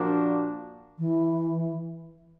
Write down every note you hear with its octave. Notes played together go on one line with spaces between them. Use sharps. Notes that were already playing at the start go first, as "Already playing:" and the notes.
Already playing: A#2 F3 A#3 D4 F#4
E3